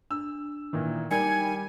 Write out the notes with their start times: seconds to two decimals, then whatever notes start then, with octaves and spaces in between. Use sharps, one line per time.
0.11 D4 E6
0.73 A#2 D#3 E3
1.11 D#3 G3 A#4 G#5 C#7